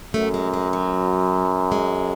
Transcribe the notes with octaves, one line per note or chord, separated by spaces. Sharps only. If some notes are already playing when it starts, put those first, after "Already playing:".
F#2 A3
G#3
G#3
F#3
G#3